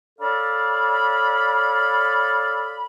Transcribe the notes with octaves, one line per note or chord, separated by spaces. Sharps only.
A4 C#5 D5 F5 B5